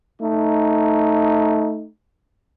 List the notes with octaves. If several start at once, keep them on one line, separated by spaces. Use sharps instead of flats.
A3 D#4